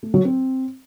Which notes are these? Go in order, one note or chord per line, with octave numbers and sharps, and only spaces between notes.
A3
F#3
C4